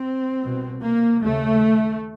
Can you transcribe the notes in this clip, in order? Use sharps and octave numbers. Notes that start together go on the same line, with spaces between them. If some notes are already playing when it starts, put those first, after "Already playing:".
Already playing: C4
C2 B2
A#3
D#2 C#3 A3